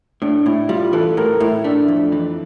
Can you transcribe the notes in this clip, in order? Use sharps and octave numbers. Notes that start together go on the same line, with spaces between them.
A2 D4
A2 E4
G3 F4
E3 A4
A2 A#4
A2 E4
A3 D4
F2
E3